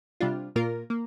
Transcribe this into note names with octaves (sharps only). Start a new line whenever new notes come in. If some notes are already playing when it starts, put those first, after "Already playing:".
C3 G3 D4 F4
A#2 A#3 F4 A#4
A#3